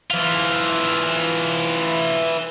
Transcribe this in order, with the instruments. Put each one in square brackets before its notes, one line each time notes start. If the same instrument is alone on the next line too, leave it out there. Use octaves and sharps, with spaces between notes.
[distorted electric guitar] E3 F4